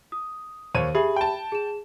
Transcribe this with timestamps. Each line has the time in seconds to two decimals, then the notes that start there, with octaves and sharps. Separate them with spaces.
0.12 D#6
0.75 D#2 C5 C#5 D#7
0.95 G4 G#4 E5 B5
1.16 G5 A5
1.52 G#4 E7